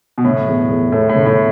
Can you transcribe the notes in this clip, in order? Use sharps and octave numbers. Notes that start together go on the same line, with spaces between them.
B2
A2 D3
E2
E2
A2 A3
A2
D3
A2